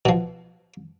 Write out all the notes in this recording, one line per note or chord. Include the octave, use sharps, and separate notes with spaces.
B2 F3